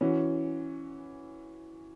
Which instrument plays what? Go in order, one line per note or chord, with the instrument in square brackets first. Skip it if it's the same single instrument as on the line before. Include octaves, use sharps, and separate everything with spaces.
[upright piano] E3 C#4 F#4